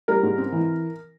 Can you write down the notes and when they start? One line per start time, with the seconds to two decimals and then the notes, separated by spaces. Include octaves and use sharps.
0.08 G3 A#4
0.23 G#2
0.38 C4
0.52 E3